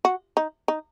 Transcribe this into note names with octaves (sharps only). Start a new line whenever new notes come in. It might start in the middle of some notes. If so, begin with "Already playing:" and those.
F#4
D#4
D#4